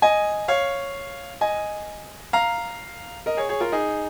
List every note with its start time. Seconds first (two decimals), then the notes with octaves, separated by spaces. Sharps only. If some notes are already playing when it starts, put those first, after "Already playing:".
0.02 D#5 G#5
0.48 C#5 F5
1.41 D#5 G#5
2.33 F5 A#5
3.26 A#4 D#5
3.37 G#4 C#5
3.49 G#4 C#5
3.60 F4 A#4
3.72 D#4 G#4